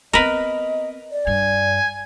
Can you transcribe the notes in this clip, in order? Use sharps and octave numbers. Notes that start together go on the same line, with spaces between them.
B3 C4 A#4 B4 D#5
D5
G2 G#5